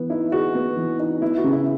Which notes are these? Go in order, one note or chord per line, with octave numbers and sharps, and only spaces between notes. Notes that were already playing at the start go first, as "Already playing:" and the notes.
Already playing: E3 B3
D#4 E4
F#4 G#4
B3
E3
D#4
B3 E4
F#4
C#3
E4